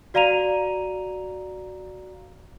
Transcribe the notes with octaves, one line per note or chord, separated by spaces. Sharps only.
F#4 D5 F5 A#5 D#7 F7